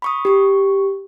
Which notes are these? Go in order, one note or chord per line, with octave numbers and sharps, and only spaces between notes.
B5 C#6 D#6
G4 C#6